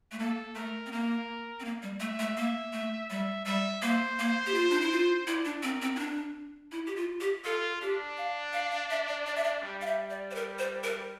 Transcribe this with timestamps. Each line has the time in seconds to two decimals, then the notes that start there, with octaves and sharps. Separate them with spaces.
0.12 A3
0.19 A#3 A4
0.55 A3 A#4
0.86 C4
0.91 A#3 A#4
1.60 C4
1.65 A#3
1.83 G3
2.00 A3 E5
2.19 A3
2.37 A#3 E5
2.73 A3
3.10 G3 E5
3.46 G3 E5
3.82 A#3 C5
4.19 A#3
4.46 G4
4.54 F4
4.71 D4
4.81 E4
4.92 F4
5.27 E4 D5
5.45 D4
5.63 C4 A#4
5.82 C4
5.96 E4
5.99 D4
6.72 E4
6.87 G4
6.96 F4
7.21 G4
7.45 F4 A4
7.82 D4 G4
8.17 F5
8.53 F5
8.71 F5
8.90 E5
9.08 D5
9.26 D5
9.36 E5
9.44 D5
9.63 G3
9.82 F5
9.86 E5
10.10 D5
10.31 C5
10.35 A#4
10.59 C5
10.84 A#4